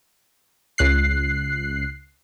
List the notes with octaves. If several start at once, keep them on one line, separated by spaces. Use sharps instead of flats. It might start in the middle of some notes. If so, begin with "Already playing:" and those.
C#2 F#6 C7